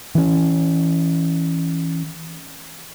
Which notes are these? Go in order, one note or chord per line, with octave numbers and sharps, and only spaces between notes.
E3 C#4